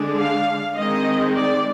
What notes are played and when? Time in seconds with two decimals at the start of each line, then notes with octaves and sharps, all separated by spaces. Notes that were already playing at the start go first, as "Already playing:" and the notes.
Already playing: D3 G#3 D4
0.18 F5
0.77 D#3 G#3 C4 D#5
1.36 D5